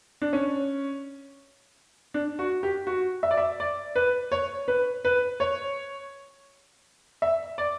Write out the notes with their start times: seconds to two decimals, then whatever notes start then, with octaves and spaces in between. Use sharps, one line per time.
0.22 D4
0.33 C#4
2.14 D4
2.39 F#4
2.63 G4
2.87 F#4
3.23 E5
3.31 D5
3.37 E5
3.60 D5
3.96 B4
4.32 C#5
4.68 B4
5.05 B4
5.40 C#5
7.22 E5
7.58 D5